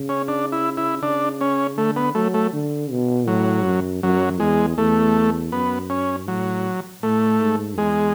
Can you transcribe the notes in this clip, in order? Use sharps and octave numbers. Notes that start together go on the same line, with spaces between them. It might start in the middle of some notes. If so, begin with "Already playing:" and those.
Already playing: C#3
C#4
D4
E4
E4
C#3 D4
C#4
D3 A3
B3
F#3 A3
A3
D3
B2
A2 F#3
F#2
F#2 F#3
E2 G#3
E2 A3
F#2 B3
C#4
A2 F#3
A2 A3
G#2
E2 G#3